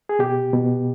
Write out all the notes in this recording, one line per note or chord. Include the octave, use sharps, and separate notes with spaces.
G#4
B2 G4
B2